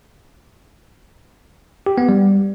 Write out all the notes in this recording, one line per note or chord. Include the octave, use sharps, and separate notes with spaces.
G4
B3
G3